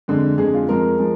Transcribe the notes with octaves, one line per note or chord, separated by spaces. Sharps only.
F2 D3 G#3
F2 D3 G#3 G#4
F4
F2 F3 G#3 A#4
F3 G#3